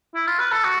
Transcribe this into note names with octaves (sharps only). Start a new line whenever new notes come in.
E4
F4
B4
A4
F#4